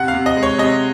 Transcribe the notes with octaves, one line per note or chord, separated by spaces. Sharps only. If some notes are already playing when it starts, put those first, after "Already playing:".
Already playing: C3 F#5
F5
C3
D#5
G#3
C#5
C3 D#5